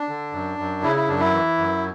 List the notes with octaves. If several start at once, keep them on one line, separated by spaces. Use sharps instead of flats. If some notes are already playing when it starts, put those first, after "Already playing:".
Already playing: D4
D3
F#2
F#2
C#3 E4
E4
F#2 D4
E4
E3
F#2